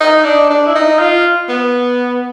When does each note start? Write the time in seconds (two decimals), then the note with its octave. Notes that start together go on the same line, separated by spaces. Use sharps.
0.01 D#4
0.24 D4
0.50 D4
0.66 E4
0.75 D#4
0.99 F4
1.49 B3